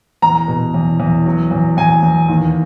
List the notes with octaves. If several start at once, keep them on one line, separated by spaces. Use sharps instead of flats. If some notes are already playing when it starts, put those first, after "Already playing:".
E2 A#5
B2
E2
E2
F#3
E2
E2 G#5
E2
D#2